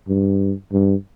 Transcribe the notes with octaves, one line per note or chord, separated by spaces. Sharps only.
G2
G2